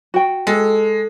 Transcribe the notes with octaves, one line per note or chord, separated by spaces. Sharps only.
F#4 G5
G#3 A4